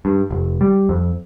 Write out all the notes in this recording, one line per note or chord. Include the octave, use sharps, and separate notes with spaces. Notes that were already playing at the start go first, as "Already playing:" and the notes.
G2
F1
G3
F2